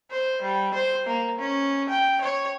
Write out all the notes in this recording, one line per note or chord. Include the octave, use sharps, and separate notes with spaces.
C5
G3
C5
A#3
C#4
G5
C#5